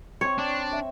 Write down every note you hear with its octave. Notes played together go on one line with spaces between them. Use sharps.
C4 C#5 C6 C#6
D4
E5